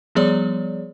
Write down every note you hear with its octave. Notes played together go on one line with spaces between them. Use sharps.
F3 G3 B3 G#4 C#5 D5